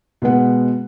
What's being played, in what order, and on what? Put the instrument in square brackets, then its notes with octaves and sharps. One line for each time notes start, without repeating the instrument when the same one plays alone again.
[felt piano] B2 G#3 B4 F#5